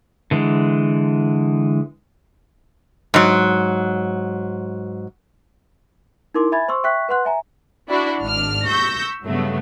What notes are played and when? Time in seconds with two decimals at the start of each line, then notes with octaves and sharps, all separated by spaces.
0.31 D3 E3 G#3
3.14 G#2 F#3
6.34 D#4 E4 A#4 C6 D6
6.52 E5 G#5 B5 G#6 A6
6.68 C5 C6 C#6 E6
6.84 E5 G5 C#6 F#6 B6
7.09 B4 F#5 C6 F#6
7.25 E5 G#5 A#5
7.89 D4 E4 F#4
8.22 G#1 G#2 D4 F6
8.67 C#6 E6 G6 A#6 B6
9.24 G2 C#3 F#3 A3 B3